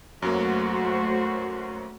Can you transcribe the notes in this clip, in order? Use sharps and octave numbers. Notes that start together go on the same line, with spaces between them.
F#2 F#3 A3 A#3 F#4 C5